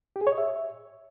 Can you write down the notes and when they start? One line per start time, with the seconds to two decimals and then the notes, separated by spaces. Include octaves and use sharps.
0.16 G4
0.21 G#4
0.27 C#5
0.32 D#5
0.38 E5